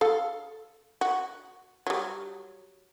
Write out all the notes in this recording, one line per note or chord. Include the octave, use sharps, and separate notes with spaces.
A4 F5
F#4
F#3 G3